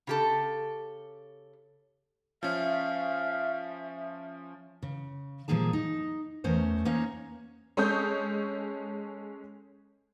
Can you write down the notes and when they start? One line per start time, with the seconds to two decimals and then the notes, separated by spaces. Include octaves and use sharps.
0.07 C#3 G4 A4
2.43 F3 C#4 E5 F5
4.83 C#3
5.48 A#2 F3 G3 A#3 G#4 A5
5.73 D#4
6.44 E2 A3 C#4 A#4 C5
6.85 A#3 C#4 D#4 C5 C#5 F5
7.77 G#3 C#4 A4 C#5 D#6 G6